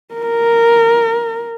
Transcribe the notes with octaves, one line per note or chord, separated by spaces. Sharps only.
A#4